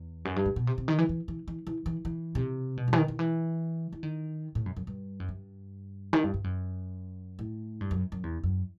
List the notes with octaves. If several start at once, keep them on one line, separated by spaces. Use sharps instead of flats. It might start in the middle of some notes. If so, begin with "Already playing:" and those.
Already playing: E2
F#2
G2
A2
B2
C3
C3
D#3
E3
E3
E3
E3
E3
E3
E3
C3
B2
G2
E3
D#3
D#3
E3
E3
D#3
A2
F#2
F#2
G2
F#2
G2
D#3
G2
G2
F#2
A2
G2
F#2
F#2
E2
F#2